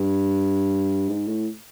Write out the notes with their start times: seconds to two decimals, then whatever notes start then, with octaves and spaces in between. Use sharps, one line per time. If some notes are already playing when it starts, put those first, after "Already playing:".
Already playing: G2
1.09 G#2
1.28 A2